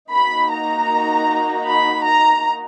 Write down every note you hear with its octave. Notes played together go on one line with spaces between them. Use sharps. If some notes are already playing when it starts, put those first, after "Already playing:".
A#3 D#4 F#4 B5
A#5
B5
A#5